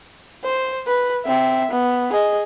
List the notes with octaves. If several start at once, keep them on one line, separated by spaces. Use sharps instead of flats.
C5
B4
C4 E5
B3
G#4 D#5